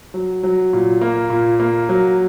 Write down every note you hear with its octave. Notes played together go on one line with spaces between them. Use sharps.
F#3
F#3
A#2
A#3
A#2
A#3
F#3